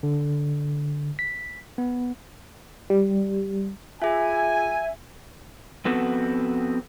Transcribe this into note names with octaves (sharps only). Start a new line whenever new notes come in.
D3
B6
B3
G3
F4 G#4 E5 G#5
F3 B3 C4 F#4 A4 B4